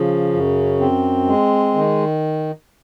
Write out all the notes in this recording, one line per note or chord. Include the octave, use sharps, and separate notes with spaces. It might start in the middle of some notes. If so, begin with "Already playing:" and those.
Already playing: C#3 F3
F#2
C4
G#3
D#3